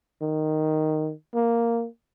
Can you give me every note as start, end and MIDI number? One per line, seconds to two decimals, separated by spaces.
0.22 1.12 51
1.35 1.86 58